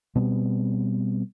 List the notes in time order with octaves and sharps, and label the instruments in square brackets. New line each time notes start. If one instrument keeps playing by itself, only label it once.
[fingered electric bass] B2 G3 B3 C4